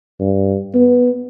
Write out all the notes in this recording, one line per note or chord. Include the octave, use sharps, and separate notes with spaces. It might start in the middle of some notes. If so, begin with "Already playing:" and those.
G2
B3